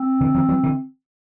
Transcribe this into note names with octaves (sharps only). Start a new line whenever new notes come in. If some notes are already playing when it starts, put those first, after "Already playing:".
Already playing: C4
D3 E3
D#3 F3
E3 F#3
D3 E3